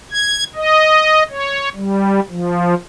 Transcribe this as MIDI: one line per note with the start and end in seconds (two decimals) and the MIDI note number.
0.11 0.44 92
0.56 1.23 75
1.30 1.69 73
1.75 2.20 55
2.30 2.74 53